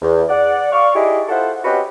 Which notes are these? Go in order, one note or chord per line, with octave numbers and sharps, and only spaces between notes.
E2
D5 F#5
D5 F5 C#6
D#4 E4 G4 G#4 D5 D#5
E4 F4 A4 C5 F#5
C4 C#4 F#4 G4 B4 D#5